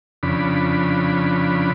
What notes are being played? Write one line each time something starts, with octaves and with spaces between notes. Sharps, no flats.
F2 C#3 D4 B5